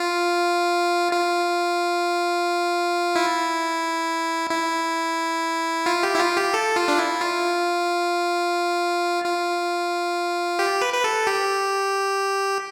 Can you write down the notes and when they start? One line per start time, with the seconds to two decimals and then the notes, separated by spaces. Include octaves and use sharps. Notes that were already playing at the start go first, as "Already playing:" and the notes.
Already playing: F4
1.13 F4
3.15 E4
4.50 E4
5.86 F4
6.03 G4
6.15 E4
6.20 F4
6.37 G4
6.54 A4
6.76 F4
6.88 D4
6.98 E4
7.21 F4
9.24 F4
10.59 G4
10.82 B4
10.94 B4
11.04 A4
11.27 G4